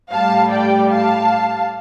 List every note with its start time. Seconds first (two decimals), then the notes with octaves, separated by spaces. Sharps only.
0.12 A2 G3 F5 A5
0.52 D5 G5
0.91 F5 A5